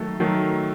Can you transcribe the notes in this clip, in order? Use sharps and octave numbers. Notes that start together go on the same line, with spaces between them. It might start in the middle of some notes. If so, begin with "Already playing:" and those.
Already playing: D#3 F#3 A3 A4
D#3 F#3 A3